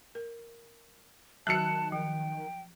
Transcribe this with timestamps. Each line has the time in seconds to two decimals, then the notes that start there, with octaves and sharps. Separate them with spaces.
0.15 A#4
1.47 D#3 F#3 F#4 A5 F#6 C#7
1.92 F3 G5